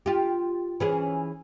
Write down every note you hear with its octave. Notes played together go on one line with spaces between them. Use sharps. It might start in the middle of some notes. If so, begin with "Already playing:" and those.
F4 G4
E3 C#4 G#4